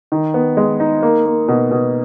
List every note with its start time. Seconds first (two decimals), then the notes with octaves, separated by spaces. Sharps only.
0.12 D#3
0.34 B3
0.57 G#3
0.80 D#4
1.03 A#3
1.26 A#3
1.48 B2
1.71 B2